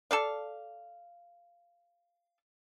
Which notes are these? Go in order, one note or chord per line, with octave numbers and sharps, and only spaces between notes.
A4 D5 F5